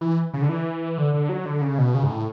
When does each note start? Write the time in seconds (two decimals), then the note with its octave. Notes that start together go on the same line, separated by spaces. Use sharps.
0.01 E3
0.34 C#3
0.42 D3
0.49 E3
0.98 D3
1.14 D3
1.29 F#3
1.45 D3
1.62 C#3
1.78 B2
1.94 C#3
2.03 G#2
2.10 A2